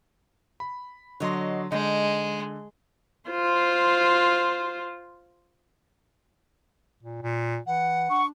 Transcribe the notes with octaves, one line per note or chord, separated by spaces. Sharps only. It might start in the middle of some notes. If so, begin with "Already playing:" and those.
B5
D3 F#3 C#5 D#5 C6
D3 G#3 D#4
F4 C5
A#2
A#2
E3 F#5
D4 C#6